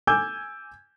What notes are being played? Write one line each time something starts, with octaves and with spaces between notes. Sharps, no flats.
G#5 D6 E6 G6 G#6